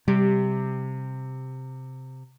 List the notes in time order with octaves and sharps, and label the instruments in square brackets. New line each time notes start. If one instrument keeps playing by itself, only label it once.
[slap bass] C3 [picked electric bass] G3 [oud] G4